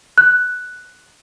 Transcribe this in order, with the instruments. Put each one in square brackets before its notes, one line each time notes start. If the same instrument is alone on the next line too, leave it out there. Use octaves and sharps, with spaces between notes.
[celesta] F#6